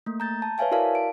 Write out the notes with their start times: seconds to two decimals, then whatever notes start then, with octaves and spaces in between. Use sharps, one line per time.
0.06 A3 A#3
0.20 A#5 G6 A6
0.42 A5
0.58 B4 C#5 E5 F5 G#5 A5
0.71 E4 F#4 A#4 D5 F5 A5
0.95 D7